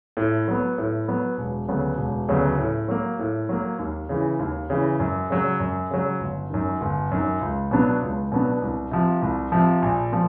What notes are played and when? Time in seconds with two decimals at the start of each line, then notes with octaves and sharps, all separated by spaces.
0.17 A2
0.48 F#3 B3
0.78 A2
1.08 F#3 B3
1.38 E1
1.68 D2 C#3 F#3 B3
1.98 E1
2.28 D2 C#3 F#3 B3
2.59 A2
2.88 F#3 A#3
3.19 A2
3.49 F#3 A#3
3.79 D#2
4.09 C#3 E3
4.39 D#2
4.70 C#3 E3
5.00 F#2
5.30 C#3 F#3
5.60 F#2
5.90 C#3 F#3
6.20 G1
6.50 F#2 D#3
6.81 G1
7.11 F#2 D#3
7.41 C#2
7.71 B2 F#3 B3 D4
8.02 C#2
8.32 B2 F#3 B3 D4
8.62 C2
8.91 C3 F3
9.22 C2
9.52 C3 F3
9.82 A#1
10.12 A#2 F3